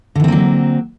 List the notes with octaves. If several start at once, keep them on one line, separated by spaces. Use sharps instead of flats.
D3 E3 F#3 A#3 C4